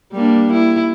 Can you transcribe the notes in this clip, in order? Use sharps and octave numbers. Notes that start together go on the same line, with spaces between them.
G3 A#3 D4
E4